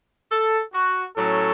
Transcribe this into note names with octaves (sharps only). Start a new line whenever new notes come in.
A4
F#4
A2 F#3 C#4 A4